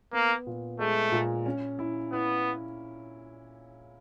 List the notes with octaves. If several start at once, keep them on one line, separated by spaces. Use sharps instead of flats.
A#3 B3
A#2
G#3 A3
A#2
C#4
E4
B3 E4